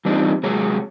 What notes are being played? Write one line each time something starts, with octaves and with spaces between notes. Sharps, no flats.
E3 G3 C4 D4 D#4 F4
C3 F#3 G#3 G#4 C#5